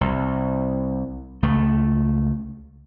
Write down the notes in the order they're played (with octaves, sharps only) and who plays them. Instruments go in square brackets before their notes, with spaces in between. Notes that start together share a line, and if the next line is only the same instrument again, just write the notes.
[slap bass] C2
C#2 A3